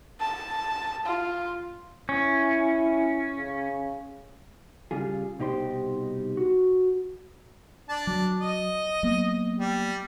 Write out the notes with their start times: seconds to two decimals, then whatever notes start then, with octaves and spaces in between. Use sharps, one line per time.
0.21 A5
1.06 F4
2.09 C#4 E4
3.38 C#3
4.91 C#3 G3 F4 G#4
5.39 C2 B2 D#4 G4 C5 C6
6.37 F#4
7.89 D4 A5
8.07 F#3
8.40 D#5
9.03 F#3 A#3 B3
9.59 G3